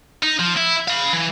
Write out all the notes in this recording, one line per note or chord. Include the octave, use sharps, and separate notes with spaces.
D#4
F3
E4
F5 B5
E3